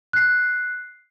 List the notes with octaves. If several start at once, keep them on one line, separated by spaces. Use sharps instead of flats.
F#6 C7